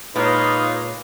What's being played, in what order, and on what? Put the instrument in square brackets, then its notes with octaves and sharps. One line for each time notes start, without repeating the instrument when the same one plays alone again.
[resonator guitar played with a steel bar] A#2 G#3 [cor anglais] D#4 [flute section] F4 C#5 D#6 [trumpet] B4